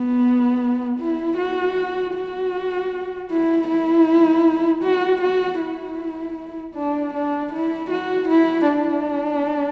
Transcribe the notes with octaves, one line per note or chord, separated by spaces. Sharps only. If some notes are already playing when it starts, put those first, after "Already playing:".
Already playing: B3
E4
F#4
F#4
E4
E4
F#4
F#4
E4
D4
D4
E4
F#4
E4
D4